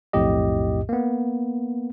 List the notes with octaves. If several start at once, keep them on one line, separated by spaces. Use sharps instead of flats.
B1 F2 A2 G4 D#5
A#3 B3